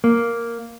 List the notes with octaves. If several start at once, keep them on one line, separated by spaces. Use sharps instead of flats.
A#3